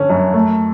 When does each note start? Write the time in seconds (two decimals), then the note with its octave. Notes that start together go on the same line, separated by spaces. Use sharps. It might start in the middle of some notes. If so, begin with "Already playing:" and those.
Already playing: D3 C#4
0.10 F#2
0.34 A3